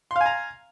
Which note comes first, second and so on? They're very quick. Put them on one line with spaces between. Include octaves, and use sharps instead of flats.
C6 F5 G#5 A#5